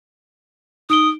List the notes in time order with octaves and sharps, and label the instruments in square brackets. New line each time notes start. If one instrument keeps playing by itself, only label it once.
[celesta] D#4 D7 G7 [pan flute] D#6